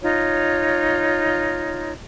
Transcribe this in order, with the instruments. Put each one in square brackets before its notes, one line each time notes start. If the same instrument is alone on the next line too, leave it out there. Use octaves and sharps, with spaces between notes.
[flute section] D#4 F4 C#5